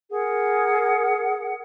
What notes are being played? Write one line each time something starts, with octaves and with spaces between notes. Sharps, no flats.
G#4 A#4 F#5